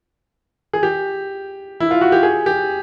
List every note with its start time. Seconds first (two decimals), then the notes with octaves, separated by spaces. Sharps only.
0.73 G#4
0.83 G4
1.80 E4
1.91 F4
2.01 F#4
2.12 G4
2.23 G#4
2.46 G4